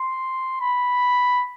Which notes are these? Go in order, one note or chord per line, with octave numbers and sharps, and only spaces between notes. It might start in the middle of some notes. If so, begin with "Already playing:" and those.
Already playing: C6
B5